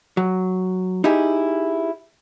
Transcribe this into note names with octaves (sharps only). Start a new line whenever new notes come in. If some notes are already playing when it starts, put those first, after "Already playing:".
F#3
D#4 E4 G4 G#4